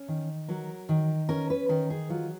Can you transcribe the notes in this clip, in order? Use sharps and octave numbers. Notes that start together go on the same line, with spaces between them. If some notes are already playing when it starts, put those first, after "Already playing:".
Already playing: C#4
D#3
F#3 A#4
D#3
C#4 A#4
B4
D#3 A#4
G#4
F#3 F4